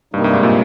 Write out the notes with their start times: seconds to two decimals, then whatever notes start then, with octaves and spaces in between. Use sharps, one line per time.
0.14 G2 C3 G3 A#3 D#4
0.24 G2
0.33 G#2
0.43 A#2